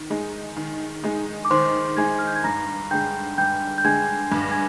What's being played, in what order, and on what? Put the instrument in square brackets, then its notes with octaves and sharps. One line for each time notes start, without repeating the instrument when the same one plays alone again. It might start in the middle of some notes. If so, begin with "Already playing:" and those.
Already playing: [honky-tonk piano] D#3
G#3 D#4
D#3
G#3 D#4
[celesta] D6
[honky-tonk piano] D#3 [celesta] C5 C6
[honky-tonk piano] G#3 D#4 [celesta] G#5 G#6
[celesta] F6
G6
G#6
[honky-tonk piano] G2 [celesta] A#5 A#6
[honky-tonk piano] D3 G#3 [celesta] G5 G6
[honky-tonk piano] G2 [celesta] G5 G6
[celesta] G6
[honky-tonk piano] D3 G#3 [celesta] G#5 G#6
[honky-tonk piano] G2 [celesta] G#6
[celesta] A#6
G#5 G#6